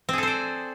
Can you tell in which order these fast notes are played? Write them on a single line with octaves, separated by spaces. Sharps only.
C4 G#4 A4 C5 D5